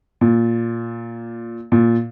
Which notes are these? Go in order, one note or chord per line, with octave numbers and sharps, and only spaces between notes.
A#2
A#2